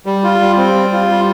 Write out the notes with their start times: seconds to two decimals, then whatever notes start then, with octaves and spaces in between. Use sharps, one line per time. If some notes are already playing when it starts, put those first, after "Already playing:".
0.06 G3
0.24 F4
0.41 G3
0.57 C4
0.74 G3
0.93 F4
1.10 G3